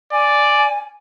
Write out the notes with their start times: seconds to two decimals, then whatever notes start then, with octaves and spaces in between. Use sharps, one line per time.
0.13 D5 G#5